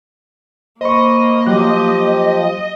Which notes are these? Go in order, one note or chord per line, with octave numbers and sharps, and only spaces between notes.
A#3 C5 D#5 B5 C#6
F3 F#3 G4 F#6